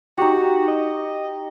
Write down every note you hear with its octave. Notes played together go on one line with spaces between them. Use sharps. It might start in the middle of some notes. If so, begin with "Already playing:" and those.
D#4 F#4 G4
D#5